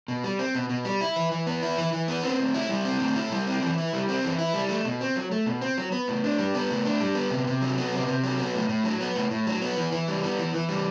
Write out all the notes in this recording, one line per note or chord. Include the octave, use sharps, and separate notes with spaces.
B2
G3
C4
B2
B2
G3
E4
E3
E3
B3
E4
E3
E3
B3
C4
A2
E4
G3
C4
A2
E4
G3
C4
E3
E4
G3
C4
E3
E4
G3
A3
B2
C4
F#3
A3
B2
C4
F#3
B3
A2
D4
G3
B3
A2
D4
G3
B3
C3
C3
F#3
B3
C3
C3
F#3
B3
A2
A2
F#3
B3
A2
A2
F#3
B3
E3
E3
G3
B3
E3
E3
G3